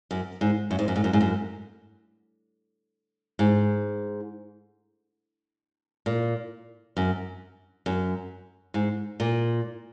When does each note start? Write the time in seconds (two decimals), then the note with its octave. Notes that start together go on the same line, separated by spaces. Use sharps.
0.11 F#2
0.41 G#2
0.71 F#2
0.79 G#2
0.88 F#2
0.96 G#2
1.04 F#2
1.13 G#2
1.21 F#2
3.39 G#2
6.06 A#2
6.97 F#2
7.86 F#2
8.74 G#2
9.20 A#2